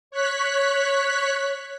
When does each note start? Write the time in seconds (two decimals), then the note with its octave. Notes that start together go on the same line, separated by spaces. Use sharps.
0.11 C#5 F#6 B6